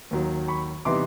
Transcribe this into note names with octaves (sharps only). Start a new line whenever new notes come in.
D#2 D#3 F#3
B5 C#6
C3 E3 G3 B3 D#4 C6 D6